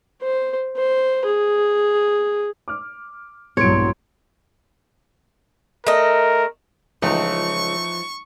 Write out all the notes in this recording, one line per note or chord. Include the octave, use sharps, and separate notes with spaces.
C5
C5
G#4
D6 F6
E1 A#1 G2 F#3 E4 C#5 C6 D7
A3 A#4 D#5
C#2 E3 F3 A3 D#4 C#6